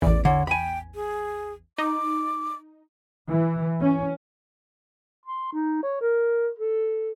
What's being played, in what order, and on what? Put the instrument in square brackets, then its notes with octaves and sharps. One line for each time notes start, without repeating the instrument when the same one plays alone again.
[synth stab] A1 E2 [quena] D5
[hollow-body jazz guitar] D3 [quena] C#5
[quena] G5 [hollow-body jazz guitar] G#5 B5
[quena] G#4
[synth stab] D#4 [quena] D6
[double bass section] E3
C#4
[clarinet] C6
D#4
C#5
A#4
A4